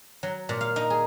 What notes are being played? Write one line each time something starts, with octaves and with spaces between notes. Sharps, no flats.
F#3
A#2
F5
D#4
G#4